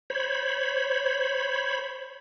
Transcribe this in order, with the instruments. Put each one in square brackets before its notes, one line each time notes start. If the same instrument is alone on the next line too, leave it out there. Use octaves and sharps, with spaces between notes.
[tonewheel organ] C5 C#5 B5